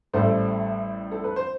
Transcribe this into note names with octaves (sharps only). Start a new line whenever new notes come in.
A1 A2 G3 A4 C5
A4
B4
C5